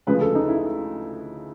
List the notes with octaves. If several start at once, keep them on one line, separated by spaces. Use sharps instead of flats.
D2 C#3 F3 G#3 B4
A4
D#4
E4